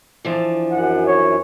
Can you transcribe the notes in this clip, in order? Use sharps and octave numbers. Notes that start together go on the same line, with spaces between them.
E3 F3 D4
F#2 F#5
C#5